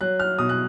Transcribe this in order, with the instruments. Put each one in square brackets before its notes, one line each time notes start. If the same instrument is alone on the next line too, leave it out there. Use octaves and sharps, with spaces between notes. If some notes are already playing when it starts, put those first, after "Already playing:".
[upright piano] F#3 F#6
F6
B2 D#6
F#6